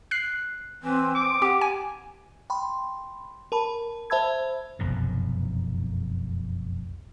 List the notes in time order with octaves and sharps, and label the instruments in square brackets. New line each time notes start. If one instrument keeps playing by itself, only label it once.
[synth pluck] F#6 C7
[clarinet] E3 [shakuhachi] C4
[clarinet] D6
[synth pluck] G4 [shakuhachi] F#5
[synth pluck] G#5
[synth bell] G5 B5 C6
A#4 A5 B5
C5 E5 A5 B5 E6 G#6
[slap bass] F1 B1 F#2 A2